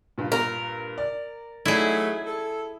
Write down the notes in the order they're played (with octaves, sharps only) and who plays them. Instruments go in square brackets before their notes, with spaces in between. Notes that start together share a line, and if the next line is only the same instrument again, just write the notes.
[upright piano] G2 A#2
[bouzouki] A#4
[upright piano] D5
[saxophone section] F#3 A3 [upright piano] D#4 D5 [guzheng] E4 G#4
[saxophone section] A4